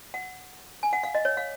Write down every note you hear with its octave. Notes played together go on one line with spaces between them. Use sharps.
F#5
G#5
F#5
F5
D#5
C#5
F5